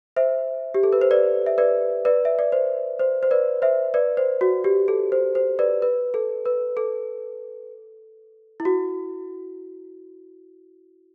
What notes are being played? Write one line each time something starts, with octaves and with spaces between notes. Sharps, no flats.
C5 E5
G4
A4
B4
C5
B4 D5
E5
B4 D5
B4 D5
E5
D5
C5
C5
C5
B4 D5
C5 E5
B4 D5
C5
F#4
G4
A4
C5
C5
B4 D5
B4
A4
B4
A4
E4
F#4